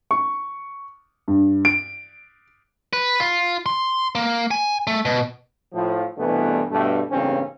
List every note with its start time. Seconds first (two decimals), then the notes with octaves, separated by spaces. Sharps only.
0.11 C#6
1.28 G2
1.65 D7
2.93 B4
3.20 F4
3.66 C6
4.15 A#3
4.51 G#5
4.87 A3
5.05 B2
5.74 A2 F3
6.18 C2 G2 B2 E3 A3 B3
6.71 G2 B2 A3
7.11 A1 G2 C#3 A#3 C4 C#4